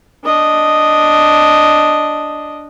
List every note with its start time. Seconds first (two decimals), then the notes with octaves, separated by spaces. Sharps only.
0.24 D4 D#5